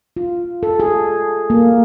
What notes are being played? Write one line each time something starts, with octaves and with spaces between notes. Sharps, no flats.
F4
A4
G#4
A#3